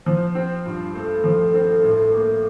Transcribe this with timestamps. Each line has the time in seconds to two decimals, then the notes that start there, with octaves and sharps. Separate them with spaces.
0.06 F3 C5
0.35 C4
0.65 G2 F4
0.95 A3 A4
1.24 F3
1.54 C4
1.84 A2
2.13 A#3